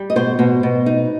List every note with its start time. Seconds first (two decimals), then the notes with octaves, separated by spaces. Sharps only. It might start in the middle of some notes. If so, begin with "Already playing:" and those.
Already playing: G3
0.10 D#5
0.16 B2 C5
0.39 B2
0.63 B2
0.86 D#4